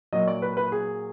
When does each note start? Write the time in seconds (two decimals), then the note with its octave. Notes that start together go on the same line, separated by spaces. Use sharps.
0.13 A#2 F#3 D#5
0.27 D5
0.42 B4
0.57 B4
0.72 G#4